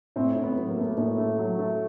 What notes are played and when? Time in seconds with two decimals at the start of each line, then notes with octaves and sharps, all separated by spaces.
0.16 A2 C4
0.36 A2
0.43 B3
0.57 F#3
0.70 A#3
0.77 A3 B3
0.90 A#3
0.97 A2
1.18 A3
1.38 F#3
1.59 A3